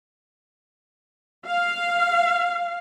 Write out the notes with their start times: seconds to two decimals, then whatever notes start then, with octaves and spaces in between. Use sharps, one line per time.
1.45 F5